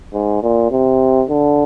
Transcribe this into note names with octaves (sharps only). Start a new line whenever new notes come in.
G#2
A#2
C3
D3